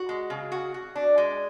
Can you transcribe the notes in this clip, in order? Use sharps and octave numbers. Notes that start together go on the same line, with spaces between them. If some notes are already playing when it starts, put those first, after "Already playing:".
Already playing: F#4
G#3
C#3
F#4
F#4
D4
G#3